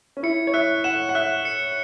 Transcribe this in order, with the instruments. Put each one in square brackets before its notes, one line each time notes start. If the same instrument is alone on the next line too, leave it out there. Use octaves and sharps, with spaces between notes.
[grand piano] C#4
[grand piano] E4 [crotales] C#7
[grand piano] C#5
[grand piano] E5 [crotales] F#6
[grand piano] F#5 [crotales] E7
[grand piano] F#5
[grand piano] E5 [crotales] F#6
[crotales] C#7